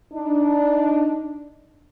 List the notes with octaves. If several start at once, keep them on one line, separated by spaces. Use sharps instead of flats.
D4 D#4